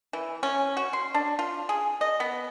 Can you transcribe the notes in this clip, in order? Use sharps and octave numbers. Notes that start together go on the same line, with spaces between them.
E3
C#4
F#4
C6
D4
F4
G#4
D#5
B3